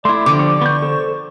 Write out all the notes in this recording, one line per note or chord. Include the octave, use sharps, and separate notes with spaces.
A3 E4 D5 C6
D3 F3 G4 D6
C#6
B3 G6
A4 C5